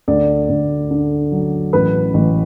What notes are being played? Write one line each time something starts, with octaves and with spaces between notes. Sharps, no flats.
D2 D5
D2
D3
F#3
A1 B4
A1